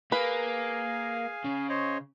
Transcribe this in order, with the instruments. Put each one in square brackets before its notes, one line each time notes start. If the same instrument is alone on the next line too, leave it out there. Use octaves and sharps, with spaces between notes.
[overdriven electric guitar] A#3 [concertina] G#4 F5 G#5 [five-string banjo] B4
[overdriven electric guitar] C#3
[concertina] C5 C#5 D#5